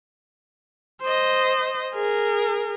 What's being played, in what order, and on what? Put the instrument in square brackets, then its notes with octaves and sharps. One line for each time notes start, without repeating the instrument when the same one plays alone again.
[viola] C5 D#5
G#4 A#4